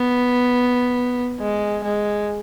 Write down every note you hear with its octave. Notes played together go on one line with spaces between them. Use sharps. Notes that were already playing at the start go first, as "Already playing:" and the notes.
Already playing: B3
G#3
G#3